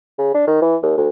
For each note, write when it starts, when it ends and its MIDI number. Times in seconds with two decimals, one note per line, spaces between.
0.19 0.33 49
0.34 0.47 62
0.47 0.58 51
0.62 0.76 52
0.83 0.94 39
0.98 1.09 38